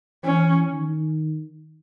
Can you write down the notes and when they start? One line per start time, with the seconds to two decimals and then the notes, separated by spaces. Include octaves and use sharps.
0.24 E3 C#4
0.73 D#3